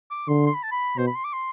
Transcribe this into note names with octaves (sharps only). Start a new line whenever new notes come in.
D6
D3 C6
C6
B5
A5
B5
B2 C5
B5
C6
D6
C6